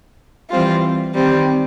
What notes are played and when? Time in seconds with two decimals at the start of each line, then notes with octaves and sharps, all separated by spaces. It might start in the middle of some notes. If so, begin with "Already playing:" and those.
0.50 E3 G3 C4 F4
1.14 D#3 G3 C4